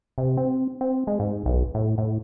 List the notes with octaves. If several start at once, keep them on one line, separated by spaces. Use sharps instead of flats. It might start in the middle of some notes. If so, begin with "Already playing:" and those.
C3
C4
C4
G#3
G#2
B1
A2
A2